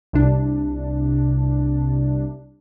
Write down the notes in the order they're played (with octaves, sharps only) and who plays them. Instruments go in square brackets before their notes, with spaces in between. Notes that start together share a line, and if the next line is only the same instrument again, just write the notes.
[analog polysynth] C2 C3 D4